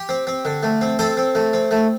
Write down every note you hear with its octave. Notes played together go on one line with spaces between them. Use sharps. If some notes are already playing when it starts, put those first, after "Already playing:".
Already playing: G4
C4
C4
D3
A3
C4
C4 A4 C5
C4
A3
C4
A3